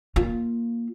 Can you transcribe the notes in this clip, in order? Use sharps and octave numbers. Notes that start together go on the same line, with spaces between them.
A#3 F4